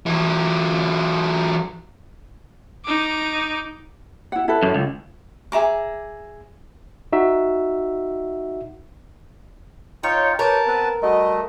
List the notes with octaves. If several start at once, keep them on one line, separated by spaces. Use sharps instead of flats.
E3 F#3
D#4 D6
E4 F#5
E4 A4 B4
F#2
C#2
G#4 E5 A#5 D6
D#4 F#4 E5
D#4 F4 C#5 G5
G4 A#4 B4 C#5 A5
B3 C4 B4
G3 A3 F#4 D#5